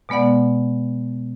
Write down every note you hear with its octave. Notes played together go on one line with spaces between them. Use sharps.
B2 G#3 B3 D5 F#5